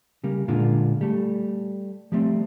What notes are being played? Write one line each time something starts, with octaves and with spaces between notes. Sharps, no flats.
C#3 G3 A#3
A#2 D3 G#3 A#3 D4 F4
G3 A3
F3 G3 A3 C4